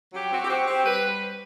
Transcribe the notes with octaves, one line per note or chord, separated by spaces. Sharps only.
F#3 G4
C4 F#4
G4
C4 F#4
C4 G4
G3 B4